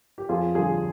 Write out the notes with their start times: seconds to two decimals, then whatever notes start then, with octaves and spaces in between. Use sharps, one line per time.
0.18 G4
0.29 F2 F4 G#4
0.55 D3 G3 F4 G#4